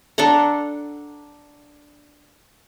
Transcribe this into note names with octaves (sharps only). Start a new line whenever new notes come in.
D4 A4 F#5 A#5